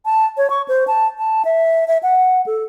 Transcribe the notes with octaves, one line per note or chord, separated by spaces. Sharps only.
A5
C#5
C#6
C5
A5
A5
E5
E5
F#5
A4